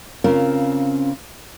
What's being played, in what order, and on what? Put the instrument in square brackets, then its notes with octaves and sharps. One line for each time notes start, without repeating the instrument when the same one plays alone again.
[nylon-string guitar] C#3 C4 C#4 F4 A#4